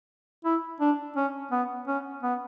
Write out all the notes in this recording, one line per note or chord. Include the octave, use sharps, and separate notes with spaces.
E4
D4
C#4
B3
C#4
B3